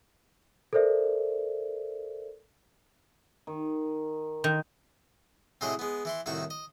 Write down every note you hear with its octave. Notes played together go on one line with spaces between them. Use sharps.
A4 A#4 C5 D5 E5
D#3
D#3 C5
A2 C3 F#3 G#3 G#4 D#5
G#3 B3
E3 E4 C6
C2 A2 D#3 F#4 C#6
D#5